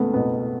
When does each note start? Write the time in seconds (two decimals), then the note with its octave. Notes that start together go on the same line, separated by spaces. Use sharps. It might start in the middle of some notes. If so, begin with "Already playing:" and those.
Already playing: C#2 A3 B3
0.14 B2 B3